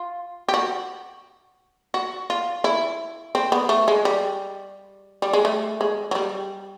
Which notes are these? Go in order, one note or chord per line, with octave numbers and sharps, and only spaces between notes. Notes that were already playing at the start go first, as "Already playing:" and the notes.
Already playing: F4
G4
F#4
F#4
F4
E4
C4
B3
A3
G#3
G3
G3
G#3
A3
G#3
F#3
G3